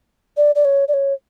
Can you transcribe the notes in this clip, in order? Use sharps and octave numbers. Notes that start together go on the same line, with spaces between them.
D5
D5
C#5
D5
C#5